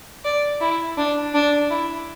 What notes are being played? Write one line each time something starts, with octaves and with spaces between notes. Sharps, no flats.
D5
E4
D4
D4
E4